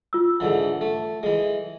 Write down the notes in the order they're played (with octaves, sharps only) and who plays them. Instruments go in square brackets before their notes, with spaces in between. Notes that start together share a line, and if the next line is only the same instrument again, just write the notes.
[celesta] F4 E6
[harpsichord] G#2 D3 E3
A3
E3 G#3